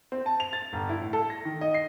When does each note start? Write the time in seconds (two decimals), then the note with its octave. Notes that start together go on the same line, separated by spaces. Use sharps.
0.12 C4
0.26 A5
0.40 F7
0.53 A6
0.73 G1
0.89 E4
1.01 A2
1.13 A4
1.30 A#6
1.45 D#3
1.61 D#5
1.74 C7